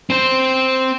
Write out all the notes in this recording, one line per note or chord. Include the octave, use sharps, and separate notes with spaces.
C4 C5